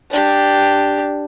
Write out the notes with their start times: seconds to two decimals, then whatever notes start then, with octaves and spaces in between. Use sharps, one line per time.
0.11 D4 G4